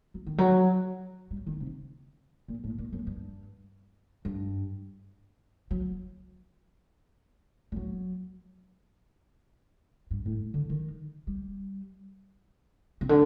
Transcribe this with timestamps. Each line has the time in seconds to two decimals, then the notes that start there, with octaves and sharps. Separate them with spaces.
0.14 F#3
0.26 D#3
0.38 F#3
1.31 G3
1.47 D#3
1.60 C3
2.48 A#2
2.64 A2
2.78 A#2
2.93 F#2
3.07 G2
4.25 G2
5.71 F#3
7.72 G3
7.76 F#3
10.11 G2
10.26 A2
10.54 D3
10.70 D#3
11.27 G3
13.01 C3
13.09 D3